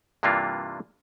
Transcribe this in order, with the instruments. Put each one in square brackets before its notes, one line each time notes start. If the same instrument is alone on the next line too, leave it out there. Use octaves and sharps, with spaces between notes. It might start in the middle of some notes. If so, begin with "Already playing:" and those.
[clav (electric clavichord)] G2 C3 E3 A#3 D4 F4